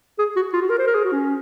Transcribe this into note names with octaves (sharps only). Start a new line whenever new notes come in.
G#4
F#4
F4
F#4
A#4
C5
A#4
G#4
F#4
C#4